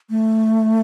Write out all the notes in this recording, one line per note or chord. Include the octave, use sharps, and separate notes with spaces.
A3